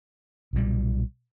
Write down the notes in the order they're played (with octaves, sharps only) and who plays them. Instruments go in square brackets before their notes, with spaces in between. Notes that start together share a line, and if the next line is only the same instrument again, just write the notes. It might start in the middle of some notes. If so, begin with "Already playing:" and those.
[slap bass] B1 A#2 G3